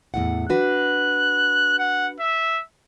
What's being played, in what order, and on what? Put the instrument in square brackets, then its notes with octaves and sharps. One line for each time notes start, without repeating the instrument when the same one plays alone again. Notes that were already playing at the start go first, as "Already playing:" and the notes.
[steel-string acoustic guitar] E2 A2 F#5
[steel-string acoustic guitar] D4 F#4 B4 [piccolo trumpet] F#6
[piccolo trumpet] F#5
E5